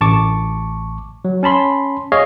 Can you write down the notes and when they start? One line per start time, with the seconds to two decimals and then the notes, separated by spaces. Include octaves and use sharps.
0.01 A1 A5 C#6 D6
1.25 F#3
1.43 C#4 A5 B5 C6
2.12 G#4 C#5 D#5 F5